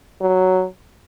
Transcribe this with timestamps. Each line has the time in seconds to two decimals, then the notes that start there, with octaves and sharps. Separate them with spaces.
0.21 F#3